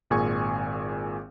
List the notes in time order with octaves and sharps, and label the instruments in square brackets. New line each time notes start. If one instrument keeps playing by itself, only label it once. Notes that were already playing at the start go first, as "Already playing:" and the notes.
[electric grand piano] G#1 A#2 G#4 G#5 C#6